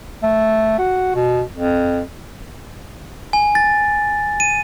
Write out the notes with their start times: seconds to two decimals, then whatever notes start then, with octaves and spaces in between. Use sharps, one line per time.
0.23 A3
0.79 F#4
1.15 B2
1.54 F2
3.33 G#5
3.55 A6
4.40 D#7